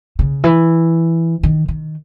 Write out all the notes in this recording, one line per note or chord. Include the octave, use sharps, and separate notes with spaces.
C#3
E3
D#3
D#3